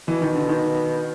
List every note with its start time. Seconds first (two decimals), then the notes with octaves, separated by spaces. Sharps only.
0.08 B2 E3
0.22 D#3
0.35 D3
0.49 D#3